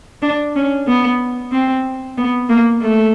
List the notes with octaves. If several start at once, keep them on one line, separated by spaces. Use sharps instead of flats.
D4
C#4
B3
C4
B3
A#3
A3